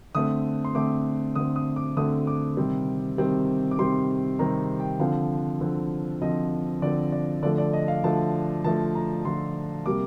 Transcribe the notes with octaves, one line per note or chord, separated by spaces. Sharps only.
D3 A3 C4 D#6
C6
D3 A3 C4 D6
D3 A3 C4 D#6
D#6
D6
D3 A3 C4 D#6
D6
C3 D#3 G3 C4
C3 D#3 G3 C4
D6
C3 D#3 G3 C4 C6
C3 D#3 G3 C4 A#5
G5
D3 F3 C4 F5
D3 F3 C4
D3 F3 C4 D#5
D3 F3 C4 D5
D5
D3 F3 A3 D5
D5
D#5
F5
D3 F3 A3 A5
D3 F3 A3 A5
A#5
D3 F3 A3 C6
C3 G3 A#3 D6